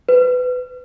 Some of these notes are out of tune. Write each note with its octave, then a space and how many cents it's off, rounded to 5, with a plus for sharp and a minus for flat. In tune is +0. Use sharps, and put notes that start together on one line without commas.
B4 +20